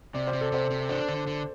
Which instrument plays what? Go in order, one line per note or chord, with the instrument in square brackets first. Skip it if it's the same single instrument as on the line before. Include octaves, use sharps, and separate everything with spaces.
[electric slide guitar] C3 [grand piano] D5
[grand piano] C5
[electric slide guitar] C3
[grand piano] A4
[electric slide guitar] C3 [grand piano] C5
[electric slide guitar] C3
[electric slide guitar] D4 [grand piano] C5
[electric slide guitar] D3
D3